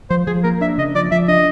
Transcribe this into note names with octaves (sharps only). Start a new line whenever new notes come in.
F3 C5
F3 G#4
A#3 A#4
D4 E5
C#3 D#5
F3 D5
F3 E5
D4 D#5